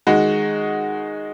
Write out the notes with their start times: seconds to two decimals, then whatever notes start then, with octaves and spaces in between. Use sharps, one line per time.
0.07 D#3 G#3 D#4 F#4